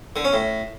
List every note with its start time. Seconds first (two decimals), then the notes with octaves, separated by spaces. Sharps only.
0.16 D3
0.24 C#4
0.33 A2